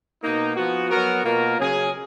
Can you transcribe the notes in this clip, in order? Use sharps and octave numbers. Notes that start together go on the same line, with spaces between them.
B2 A#3 D#4
F3 B3 F#4
F#3 B3 F#4 A#4
B2 A#3 F4 A#4
C#3 F#3 C#4 G#4